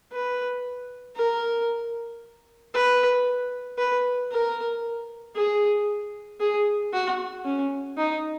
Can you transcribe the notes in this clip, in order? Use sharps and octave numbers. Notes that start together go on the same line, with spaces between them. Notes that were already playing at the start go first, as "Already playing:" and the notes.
B4
A#4
B4
B4
A#4
G#4
G#4
F#4
C#4
D#4